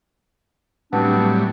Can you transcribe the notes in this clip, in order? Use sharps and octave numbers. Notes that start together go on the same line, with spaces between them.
A2 F#3 G3 B3 C4 D4